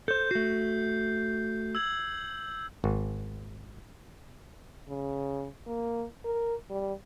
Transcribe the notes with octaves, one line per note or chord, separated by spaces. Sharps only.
A4 C5 G6
A3 F#4 C7
E6 G#6 F#7
G#1
C#3
A#3
A#4
G3